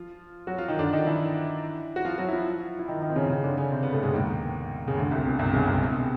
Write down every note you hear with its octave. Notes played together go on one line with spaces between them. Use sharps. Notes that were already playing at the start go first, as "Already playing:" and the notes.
Already playing: F3 F4
F#3 F#4
F3 F4
D#3 D#4
D3 D4
D#3 D#4
E3 E4
F#4
F3 F4
F#3 F#4
E4
F3 F4
E4
D#3 D#4
D#3 D#4
C4
C#3 C#4
C#3 C#4
D3 D4
C#3 C#4
C3 C4
B2 B3
A2 A3
G#2 G#3
D#2 D#3
C#3
D2 D3
C2 C3
B2
C2 C3
C#2 C#3
C2 C3
C3
B2